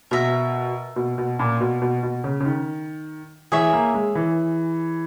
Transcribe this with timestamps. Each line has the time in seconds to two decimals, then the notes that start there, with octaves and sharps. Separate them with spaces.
0.11 B2 A#4 E5 A#5
0.96 B2
1.18 B2
1.39 A#2
1.61 B2
1.82 B2
2.03 B2
2.24 C#3
2.40 C#3
2.45 D#3
3.52 E3 G#4 C#5 E5
3.73 A#3
3.94 G#3
4.15 E3